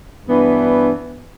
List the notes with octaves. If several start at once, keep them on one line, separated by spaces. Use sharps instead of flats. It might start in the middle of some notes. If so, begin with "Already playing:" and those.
G2 E3 B3 D4